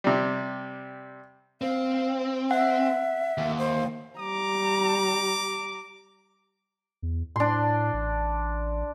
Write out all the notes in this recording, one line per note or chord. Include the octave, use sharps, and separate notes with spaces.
C3 G3
C4 F5
E5 F#5
D#2
C5
G3 A#5 D6
E2
A2 D4 C6
A1